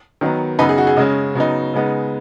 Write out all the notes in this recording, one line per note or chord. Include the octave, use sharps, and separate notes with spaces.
D#3 F#3 B3
F#2 C#3 B3 D#4 B4
G#4
F#4
G#4
C#3 G#3 C#4 D#5
C#3 F#3 B3 D#4
C#3 G#3 B3 D#4